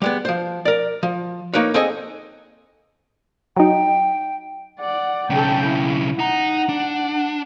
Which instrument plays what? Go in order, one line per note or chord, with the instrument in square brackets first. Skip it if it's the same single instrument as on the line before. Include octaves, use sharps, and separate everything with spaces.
[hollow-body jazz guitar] G3 G#3 B3
F3 C5
A#4 D5
F3
A#3 D#4 A#4 B4 C#5
C4 G#4 A4 D#5 G#5
[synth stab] F#3 D#4 [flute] G5
[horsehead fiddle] D5 F#5
[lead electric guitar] B1 C#3 [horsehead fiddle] A4 G5
[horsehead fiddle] E4
[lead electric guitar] D#4 A#5 [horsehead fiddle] F#5
[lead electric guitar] D4